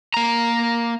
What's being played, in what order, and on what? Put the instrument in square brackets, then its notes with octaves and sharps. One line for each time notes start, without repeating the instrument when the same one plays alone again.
[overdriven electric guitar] A#3 A#5